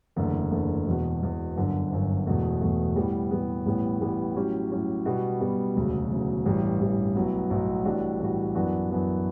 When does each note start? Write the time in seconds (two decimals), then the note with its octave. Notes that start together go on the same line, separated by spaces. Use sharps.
0.16 F#1 E2 D3 A3
0.51 F#1 E2 D3 A3
0.86 E1 E2 B2
1.22 E1 E2 B2
1.56 G1 F#2 D3
1.91 G1 F#2 D3
2.26 E1 E2 B2 A3
2.61 E1 E2 B2 A3
2.96 A2 E3 G3 B3
3.31 A2 E3 G3 B3
3.66 A1 A2 G3 B3
4.01 A1 A2 G3 B3
4.36 A2 F#3 C#4 G4
4.71 A2 F#3 C#4 G4
5.06 B2 G3 B3 F#4
5.40 B2 G3 B3 F#4
5.75 E1 D2 C#3 F#3
6.10 E1 D2 C#3 F#3
6.46 A1 G2 E3 G3
6.80 A1 G2 E3 G3
7.15 B1 A2 F#3 B3
7.50 B1 A2 F#3 B3
7.85 A1 A2 G3 D4 F#4
8.20 A1 A2 G3 D4 F#4
8.55 F#2 E3 B3 D4 F#4
8.90 F#2 E3 B3 D4 F#4